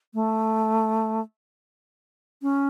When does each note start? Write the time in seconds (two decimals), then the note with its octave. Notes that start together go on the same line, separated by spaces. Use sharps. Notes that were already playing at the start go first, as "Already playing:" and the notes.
0.14 A3
2.42 C#4